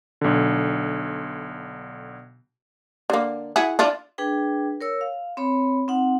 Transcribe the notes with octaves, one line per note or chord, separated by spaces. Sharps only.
B1 D3
D3 A#3
E4 F#4 G#4
D4 E4 F4
D4 G#4 B4 G5
A#4 C#5 E6
F5
C4 C#5 B5
C4 D#4 F#5